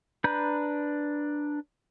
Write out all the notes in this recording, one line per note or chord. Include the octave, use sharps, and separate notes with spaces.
D4 B4 A#5 B5 G6